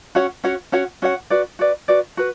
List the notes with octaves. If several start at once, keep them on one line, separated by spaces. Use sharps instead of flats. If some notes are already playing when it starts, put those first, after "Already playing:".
C#4 F#4 C#5 F#5
C#4 F#4 C#5 F#5
C#4 F#4 C#5 F#5
C#4 F#4 C#5 F#5
F#4 B4 D5
F#4 B4 D5
F#4 B4 D5
F#4 B4